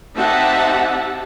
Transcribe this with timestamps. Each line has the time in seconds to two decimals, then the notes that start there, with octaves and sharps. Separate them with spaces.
0.17 C4 D#4 G4 E5 F#5 A5